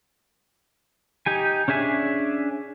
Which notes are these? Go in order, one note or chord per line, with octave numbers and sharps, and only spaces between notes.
D#4 G4 G#5
C#4 D4 G#4 E5 G#5